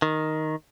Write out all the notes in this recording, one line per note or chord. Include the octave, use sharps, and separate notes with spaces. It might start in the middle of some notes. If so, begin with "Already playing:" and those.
D#3